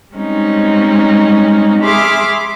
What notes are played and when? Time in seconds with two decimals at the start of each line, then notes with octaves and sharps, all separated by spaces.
0.14 G3 G#3 C4 C#4 D#4
1.81 G#4 E5 B5 C6 D6 F6